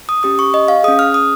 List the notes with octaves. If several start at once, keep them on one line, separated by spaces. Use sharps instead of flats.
D#6
C#4 G4 D#6
C#6
D#5
F5
C#4 G#4 D#6
F6
D#6